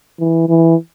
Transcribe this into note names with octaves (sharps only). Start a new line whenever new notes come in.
E3
E3